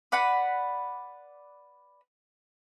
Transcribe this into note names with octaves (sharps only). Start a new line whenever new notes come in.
B4 D5 F#5 B5